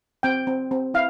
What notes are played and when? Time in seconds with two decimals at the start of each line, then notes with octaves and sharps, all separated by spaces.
0.23 C4 G5
0.47 C4
0.71 C4
0.94 E4 F5